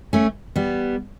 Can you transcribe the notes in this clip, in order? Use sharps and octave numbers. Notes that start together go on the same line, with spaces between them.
A3 C#4
G3 B3